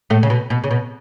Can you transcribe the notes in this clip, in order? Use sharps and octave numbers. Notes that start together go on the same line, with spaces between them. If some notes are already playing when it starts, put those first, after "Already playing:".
A2 A3
C#3
B2
B2
C#3
B2